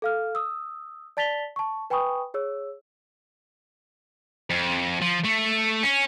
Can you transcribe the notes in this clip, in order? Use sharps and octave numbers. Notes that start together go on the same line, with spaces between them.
A4 F5 F6
D#6 E6
D5 A5 A6 B6 F7 G7
A5 C#6
B4 G5 G#5 B5 C#6 D#6
G#4 C#5 E6
F2
F3
A3
C#4